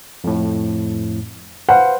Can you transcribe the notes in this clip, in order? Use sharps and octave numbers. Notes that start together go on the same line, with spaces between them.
F2 A2
B4 C5 F5 F#5